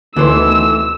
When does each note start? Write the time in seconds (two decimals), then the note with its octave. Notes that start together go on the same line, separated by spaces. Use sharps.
0.16 D2 B2 D#3 E3 A3 C5 E6